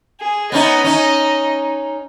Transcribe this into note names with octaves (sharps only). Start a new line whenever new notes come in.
G#4
B3 C#4 D#4 D#5
C#4 D#4